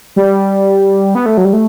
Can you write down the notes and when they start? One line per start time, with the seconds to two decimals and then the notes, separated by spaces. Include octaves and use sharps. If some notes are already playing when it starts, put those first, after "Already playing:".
0.16 G3
1.15 B3
1.26 A3
1.37 F#3
1.45 G3
1.53 A3